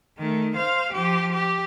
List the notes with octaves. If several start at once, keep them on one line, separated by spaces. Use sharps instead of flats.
D#3 A3
C5 F5
F3 G4
G4